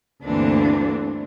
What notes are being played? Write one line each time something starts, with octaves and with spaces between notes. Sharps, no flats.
D2 G2 E3 A#3 C4 D4